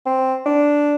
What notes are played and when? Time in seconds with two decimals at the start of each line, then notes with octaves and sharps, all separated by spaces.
0.06 C4
0.46 D4